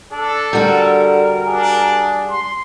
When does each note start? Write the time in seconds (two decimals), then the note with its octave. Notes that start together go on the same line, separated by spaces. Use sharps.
0.12 D4 A4
0.53 D3 G3 F#4 A#4
1.47 D4 G#4
2.28 C6